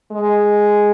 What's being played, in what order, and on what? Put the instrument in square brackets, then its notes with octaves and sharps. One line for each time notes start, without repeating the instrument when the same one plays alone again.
[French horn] G#3